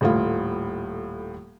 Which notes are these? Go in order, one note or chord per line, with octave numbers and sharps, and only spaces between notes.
D#1 A2 F4